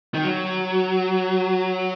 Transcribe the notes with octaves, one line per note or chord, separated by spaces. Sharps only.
D#3
F#3